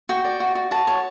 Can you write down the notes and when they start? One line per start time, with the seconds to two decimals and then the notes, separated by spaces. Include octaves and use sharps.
0.09 F#4 G5
0.25 D5
0.40 F#4
0.55 F#4
0.71 F#4 A5
0.87 C#5